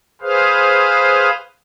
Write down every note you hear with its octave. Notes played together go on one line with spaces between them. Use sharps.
G#4 B4 C5 F5